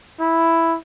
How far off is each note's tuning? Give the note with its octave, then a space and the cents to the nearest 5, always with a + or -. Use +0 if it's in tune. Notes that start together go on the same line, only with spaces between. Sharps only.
E4 +0